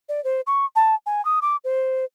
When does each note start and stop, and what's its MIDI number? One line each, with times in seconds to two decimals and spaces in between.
0.09 0.23 74
0.24 0.41 72
0.47 0.65 85
0.76 0.95 81
1.06 1.24 80
1.25 1.39 87
1.42 1.56 86
1.64 2.05 72